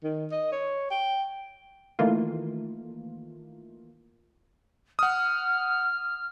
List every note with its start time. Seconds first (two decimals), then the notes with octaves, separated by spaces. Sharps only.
0.03 D#3
0.32 D#5
0.52 C#5
0.90 G5
1.99 D#3 E3 A3 A#3 F4
4.99 F#5 D#6 F6